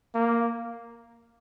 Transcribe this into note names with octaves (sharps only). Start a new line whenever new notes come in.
A#3